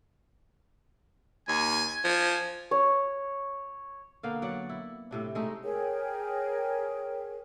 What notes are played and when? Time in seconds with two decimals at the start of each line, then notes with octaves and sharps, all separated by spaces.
1.48 D#2 G#5
2.05 F3 G#5
2.71 C#5
4.23 D3 A#3 B3 F5
4.42 F#3 D5 F#5
4.69 E4
5.11 A2 C3 D4
5.35 G#3 A3 D#4
5.63 G#4 A#4 C#5 G5